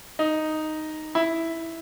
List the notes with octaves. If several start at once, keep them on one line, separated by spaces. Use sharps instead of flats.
D#4
E4